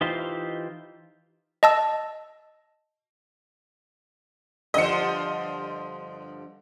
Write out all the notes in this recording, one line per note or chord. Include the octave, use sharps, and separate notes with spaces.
E3 D#4 F4 G4 C5
D#5 A5 E6
G2 D3 F3 D#5 C#7